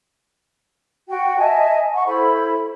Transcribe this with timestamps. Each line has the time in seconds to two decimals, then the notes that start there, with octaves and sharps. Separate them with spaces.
1.09 F#4 G5
1.37 D#5 E5 G#5 A5
1.94 F#5 C#6
2.07 E4 A4 C5 B5